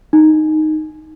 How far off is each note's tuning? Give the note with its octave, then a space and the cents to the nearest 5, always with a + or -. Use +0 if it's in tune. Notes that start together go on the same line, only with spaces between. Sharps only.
D#4 -5